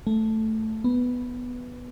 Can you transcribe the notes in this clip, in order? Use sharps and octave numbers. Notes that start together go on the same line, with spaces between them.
A3
B3